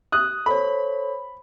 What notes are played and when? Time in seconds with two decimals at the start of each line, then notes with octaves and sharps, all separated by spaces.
0.12 D#6 F#6
0.46 A4 C5 C#5 B5